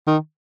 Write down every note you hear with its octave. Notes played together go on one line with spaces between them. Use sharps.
D#3